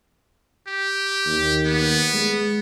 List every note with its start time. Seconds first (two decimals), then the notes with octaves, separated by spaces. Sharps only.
0.68 G4
1.25 D#2
1.65 B3
2.14 G#3